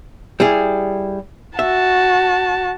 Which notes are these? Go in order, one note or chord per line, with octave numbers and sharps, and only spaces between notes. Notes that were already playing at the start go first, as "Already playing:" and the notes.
G3 E4 G#4
F#4 E5 A5